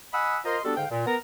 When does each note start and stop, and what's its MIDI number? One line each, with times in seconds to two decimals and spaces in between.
0.14 0.38 75
0.14 0.38 78
0.14 0.38 80
0.14 0.38 83
0.14 0.38 87
0.14 0.38 88
0.45 0.58 65
0.45 0.58 70
0.45 0.58 72
0.45 0.58 75
0.45 0.58 82
0.45 0.58 84
0.64 0.76 55
0.64 0.76 59
0.64 0.76 62
0.64 0.76 66
0.64 0.76 69
0.77 0.85 44
0.77 0.85 50
0.77 0.85 77
0.77 0.85 79
0.90 1.07 46
1.07 1.16 59
1.07 1.16 70
1.07 1.16 82